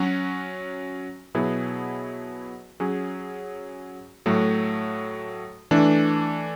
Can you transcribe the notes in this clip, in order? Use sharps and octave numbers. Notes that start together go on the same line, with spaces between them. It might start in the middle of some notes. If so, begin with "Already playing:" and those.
Already playing: F#3 C#4 F#4
B2 F#3 B3 E4 G#4
F#3 C#4 G#4
A2 F#3 A3
E3 A3 D4